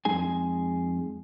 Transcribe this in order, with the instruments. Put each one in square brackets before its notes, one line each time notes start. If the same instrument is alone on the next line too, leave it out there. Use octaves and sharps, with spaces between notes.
[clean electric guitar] F2 G#3 D#4 G#4 G#5